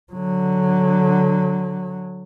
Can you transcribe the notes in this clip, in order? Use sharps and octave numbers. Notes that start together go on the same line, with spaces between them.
D3 F#3